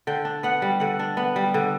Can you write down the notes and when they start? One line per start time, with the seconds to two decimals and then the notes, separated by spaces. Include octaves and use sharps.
0.07 D3 G5
0.25 D4
0.43 B3 F#5
0.62 G3
0.80 D3 F#5
0.99 D4
1.17 B3
1.36 G3
1.54 D3